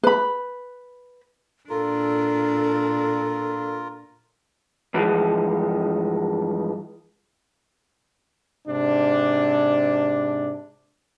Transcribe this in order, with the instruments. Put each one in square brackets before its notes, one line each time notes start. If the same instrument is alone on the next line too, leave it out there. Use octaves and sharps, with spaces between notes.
[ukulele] B4 B5
[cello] A#2 D4 [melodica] F4 A#4 [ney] A4
[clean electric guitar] G2 E3 F3 G#3
[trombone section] G#2 C3 D4